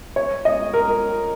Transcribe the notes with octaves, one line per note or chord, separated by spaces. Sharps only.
C#5
D#5
A#4